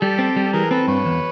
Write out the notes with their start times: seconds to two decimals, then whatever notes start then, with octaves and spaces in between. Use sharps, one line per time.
0.01 G3 G4 A4
0.19 C4
0.36 G3
0.43 A4
0.53 E3 G#4 A#4
0.70 C4 A4 B4
0.87 G2 B4 C#5
1.05 E2